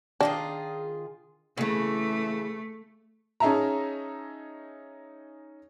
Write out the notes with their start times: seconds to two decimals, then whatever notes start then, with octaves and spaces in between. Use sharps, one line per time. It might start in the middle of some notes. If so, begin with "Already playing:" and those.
0.21 D#3 D4 F4 G#4
1.58 C#3 E3 A3
3.40 C#4 D#4 G#4 E5 A5 A#5